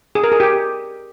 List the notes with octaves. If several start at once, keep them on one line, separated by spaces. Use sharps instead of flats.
G#4
A#4
G#4
G4